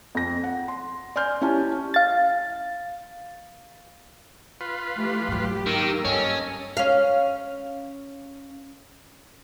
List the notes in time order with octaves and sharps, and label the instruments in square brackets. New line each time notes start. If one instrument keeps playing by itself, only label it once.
[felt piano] F2 A#6
F#5
C6
D5 G#5 C6 F6 G6
C#4 E4 G4 G#5 A5
[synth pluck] F5 A6
[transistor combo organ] F4 B4
[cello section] E3 A3 G4
[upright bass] G#2 F#3 [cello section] G4
[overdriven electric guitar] D#3 [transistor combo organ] A#3 E6
[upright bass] G2 [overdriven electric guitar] C#4 [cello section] A4 D#5
[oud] C#4 F5